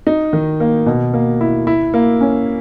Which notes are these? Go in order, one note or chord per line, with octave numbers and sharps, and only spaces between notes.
D#4
D#3
A#3
B2
A#3
E4
E4
A#3
C#4